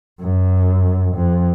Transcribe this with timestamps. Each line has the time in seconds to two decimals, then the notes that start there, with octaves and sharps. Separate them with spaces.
0.20 F#2
1.15 F2